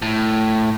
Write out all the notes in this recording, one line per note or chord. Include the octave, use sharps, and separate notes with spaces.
A2